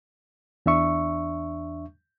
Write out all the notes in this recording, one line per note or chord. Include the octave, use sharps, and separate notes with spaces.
E2 D4 E5 C#6